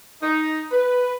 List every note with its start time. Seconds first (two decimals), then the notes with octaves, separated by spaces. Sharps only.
0.21 D#4
0.71 B4